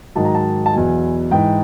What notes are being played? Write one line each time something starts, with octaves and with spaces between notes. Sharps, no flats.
G#2 D#3 F#3 A5
A#5
A5
A5
E2 B2 F#3 G#5
G#2 E3 G5